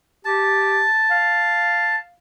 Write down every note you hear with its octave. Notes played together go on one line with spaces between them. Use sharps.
G4 A5
F5